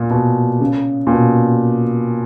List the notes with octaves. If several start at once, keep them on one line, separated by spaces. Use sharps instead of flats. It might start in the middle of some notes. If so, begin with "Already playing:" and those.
Already playing: A#2
B2
C#3
A#2
B2